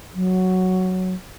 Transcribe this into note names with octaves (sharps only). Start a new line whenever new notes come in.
F#3